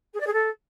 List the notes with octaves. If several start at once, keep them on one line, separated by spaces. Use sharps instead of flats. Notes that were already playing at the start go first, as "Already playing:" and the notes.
G#4
D5
G#4
A4